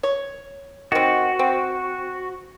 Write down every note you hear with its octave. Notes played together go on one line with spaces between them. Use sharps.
C#5
D#3 C4 F#4
C4